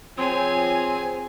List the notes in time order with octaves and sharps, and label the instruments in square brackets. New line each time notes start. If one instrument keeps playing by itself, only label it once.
[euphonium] F3 [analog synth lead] C4 [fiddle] G#4 G#5 [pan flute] C#5